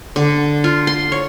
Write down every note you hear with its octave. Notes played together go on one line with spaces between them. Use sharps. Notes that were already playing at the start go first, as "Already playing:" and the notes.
D3
F4
C6
C#5